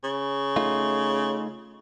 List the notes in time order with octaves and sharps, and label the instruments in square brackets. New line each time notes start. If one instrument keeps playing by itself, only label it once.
[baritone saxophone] C#3
[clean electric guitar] A3 D#4 F4